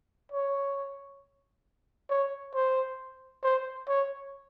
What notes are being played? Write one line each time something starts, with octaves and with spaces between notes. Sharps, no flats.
C#5
C#5
C5
C5
C#5